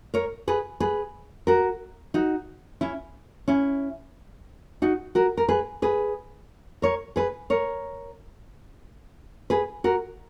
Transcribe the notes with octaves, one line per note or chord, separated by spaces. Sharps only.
A#4 C#5
G#4 B4
G#4 B4
F#4 A#4
D#4 F#4
C#4 E4
C#4 E4
D#4 F#4
F#4 A#4
A#4
G#4 B4
G#4 B4
A#4 C#5
G#4 B4
A#4 C#5
G#4 B4
F#4 A#4